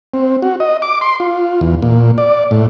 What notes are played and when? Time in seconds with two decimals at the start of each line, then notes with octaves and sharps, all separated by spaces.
0.14 C4
0.42 F#4
0.60 D#5
0.82 D6
1.01 C6
1.20 F4
1.61 E2
1.82 A#2
2.18 D5
2.51 A2